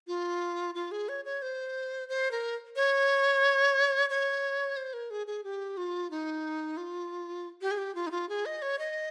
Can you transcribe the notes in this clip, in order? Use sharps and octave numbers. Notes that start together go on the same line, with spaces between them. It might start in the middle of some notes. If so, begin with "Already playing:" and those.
F4
F4
G#4
C#5
C#5
C5
C5
A#4
C#5
C#5
C5
A#4
G#4
G#4
G4
F4
D#4
F4
G4
G#4
G4
F4
D#4
F4
G#4
D#5
C#5
D#5